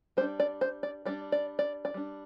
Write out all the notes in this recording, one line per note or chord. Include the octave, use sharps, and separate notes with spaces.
G3 D4 C5
D5
C5
D5
G3 D4 D5
D5
D5
D5
G3 D4